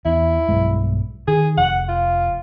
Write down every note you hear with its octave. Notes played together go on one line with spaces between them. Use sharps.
E2 E4
B1 G2 G#3
D#3 G#4
F1 F#5
F4